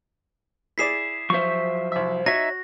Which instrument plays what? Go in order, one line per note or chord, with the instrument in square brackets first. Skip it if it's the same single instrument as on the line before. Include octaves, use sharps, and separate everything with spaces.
[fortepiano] E4 G#4 D5 [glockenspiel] B6 C7 E7
[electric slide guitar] F3 F#3 C5 [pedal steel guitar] E5 C#6
[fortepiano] C2 E5
[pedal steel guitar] D#4 E5 [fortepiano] F#4 [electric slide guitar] C#5 [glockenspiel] A#6